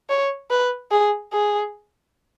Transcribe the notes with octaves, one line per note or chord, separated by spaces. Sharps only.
C#5
B4
G#4
G#4